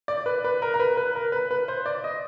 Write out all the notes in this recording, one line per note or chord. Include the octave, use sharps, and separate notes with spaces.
D5
B4
B4
A#4
A#4
B4
B4
A#4
B4
B4
C5
D5
D#5